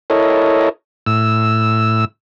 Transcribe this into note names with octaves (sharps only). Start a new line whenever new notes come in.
E4 A4 A#4 C#5 D#5
A2 E6